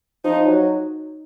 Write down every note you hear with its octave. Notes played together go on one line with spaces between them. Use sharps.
F3 D#4
F#3